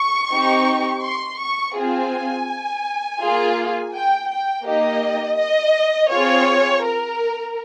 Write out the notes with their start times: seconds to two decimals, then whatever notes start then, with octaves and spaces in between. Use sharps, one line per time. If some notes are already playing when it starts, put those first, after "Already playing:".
Already playing: C#6
0.31 C4 D#4 G4
1.03 C6
1.40 C#6
1.76 C4 F4 G#4 G#5
3.21 A#3 F4 G#4
3.93 G5
4.29 G5
4.66 A#3 D#4 G4 D#5
5.38 D#5
6.11 C4 F4 G#4 C#5
6.84 A#4